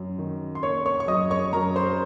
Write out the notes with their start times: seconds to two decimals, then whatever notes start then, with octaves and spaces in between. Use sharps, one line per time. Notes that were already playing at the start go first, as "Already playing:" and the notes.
Already playing: F#2
0.18 D#3
0.55 C6
0.63 A#3 C#5 C#6
0.86 C#5 C#6
1.00 C#6
1.08 F#2 D#5 D#6
1.31 C#5 C#6
1.53 F#2 A#4 A#5
1.76 C5 C6